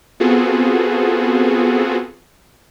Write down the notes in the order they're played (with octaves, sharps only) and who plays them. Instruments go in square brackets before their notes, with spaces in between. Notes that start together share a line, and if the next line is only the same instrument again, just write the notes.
[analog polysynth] B3 C4 F4 F#4 G#4 A4